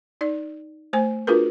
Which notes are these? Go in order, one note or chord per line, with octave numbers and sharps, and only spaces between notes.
D#4 D5
A3 C5 G#5
D4 F4 F#4 G#4 A#4 B4